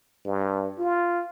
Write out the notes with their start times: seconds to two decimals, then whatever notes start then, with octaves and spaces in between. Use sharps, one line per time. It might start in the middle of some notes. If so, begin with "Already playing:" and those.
0.25 G2
0.79 F4